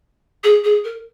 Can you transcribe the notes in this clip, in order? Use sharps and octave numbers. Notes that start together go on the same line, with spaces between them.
G#4
G#4
A#4